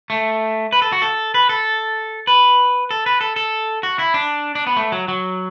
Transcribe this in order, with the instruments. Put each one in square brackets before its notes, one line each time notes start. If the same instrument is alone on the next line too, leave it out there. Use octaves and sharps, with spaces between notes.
[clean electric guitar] A3
B4
A4
F#4
A4
B4
A4
B4
A4
B4
A4
A4
F#4
E4
D4
D4
B3
A3
F#3
F#3